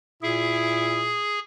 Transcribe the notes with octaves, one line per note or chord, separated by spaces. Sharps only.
A#2 E4 G#4